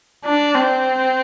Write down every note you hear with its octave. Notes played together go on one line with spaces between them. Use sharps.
D4
C4